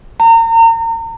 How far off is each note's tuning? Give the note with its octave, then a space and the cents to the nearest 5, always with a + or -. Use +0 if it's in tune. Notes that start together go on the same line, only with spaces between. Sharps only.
A#5 -35